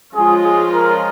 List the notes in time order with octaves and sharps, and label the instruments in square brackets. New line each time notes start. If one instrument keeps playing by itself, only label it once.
[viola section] F3 G#3 C#4 F4 [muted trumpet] G#4
[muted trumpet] G#4
A#4